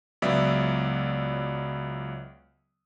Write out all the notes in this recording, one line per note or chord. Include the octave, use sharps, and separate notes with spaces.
C#2 F#3 B3 D5 E5